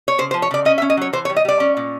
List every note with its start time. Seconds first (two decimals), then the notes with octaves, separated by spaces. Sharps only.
0.08 C#5
0.18 C#3 C5
0.31 C5
0.34 F3
0.42 C#5
0.51 C#3 D5
0.65 C#4 D#5
0.78 E5
0.82 C#4
0.90 D#5
0.97 F#3 C#5
1.13 E3 C5
1.25 C#5
1.30 G3
1.36 D#5
1.45 G3 D5
1.60 C#4
1.77 A#2